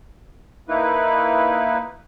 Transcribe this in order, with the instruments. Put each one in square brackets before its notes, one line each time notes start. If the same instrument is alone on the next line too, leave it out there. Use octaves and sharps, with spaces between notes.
[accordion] A#3 D#4 E4 B4